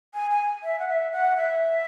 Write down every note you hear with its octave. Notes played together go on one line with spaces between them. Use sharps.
G#5
G#5
E5
F#5
E5
F#5
E5